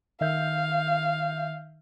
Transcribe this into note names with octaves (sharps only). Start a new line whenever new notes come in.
D#3 E5 F5 G6